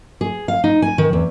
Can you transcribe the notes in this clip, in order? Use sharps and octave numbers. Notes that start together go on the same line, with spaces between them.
G#4
F5
D#4
G#5
D#3
E2